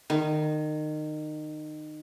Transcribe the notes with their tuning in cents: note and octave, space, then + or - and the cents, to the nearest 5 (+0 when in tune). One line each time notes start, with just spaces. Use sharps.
D#3 -25